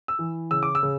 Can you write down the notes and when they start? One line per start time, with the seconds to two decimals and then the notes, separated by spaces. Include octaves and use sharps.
0.08 E6
0.19 E3
0.51 C#3 E6
0.63 D6
0.75 E6
0.83 C#3